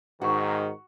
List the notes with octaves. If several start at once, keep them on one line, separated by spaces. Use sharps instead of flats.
G#2 D#3 F#4